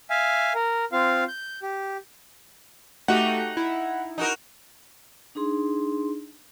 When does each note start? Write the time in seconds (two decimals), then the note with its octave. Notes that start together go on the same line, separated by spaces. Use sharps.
0.10 E5 F5 G#5
0.55 A#4
0.92 C4 F4 F5
1.28 G6
1.62 G4
3.08 A3 D#4 F#4 G4 F#5
3.57 E4
4.18 D#4 F#4 A#4
5.35 D4 D#4 G#4 C6